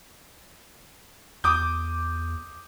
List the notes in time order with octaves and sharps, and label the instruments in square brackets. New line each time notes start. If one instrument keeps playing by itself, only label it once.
[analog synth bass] E2 [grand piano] D6 D#6 G6